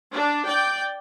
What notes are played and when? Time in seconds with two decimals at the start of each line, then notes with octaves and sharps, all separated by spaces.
0.13 D4
0.46 D5 G5